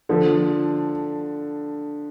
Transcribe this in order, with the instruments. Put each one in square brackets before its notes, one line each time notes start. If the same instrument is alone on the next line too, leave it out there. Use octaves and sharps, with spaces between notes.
[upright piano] D3 F3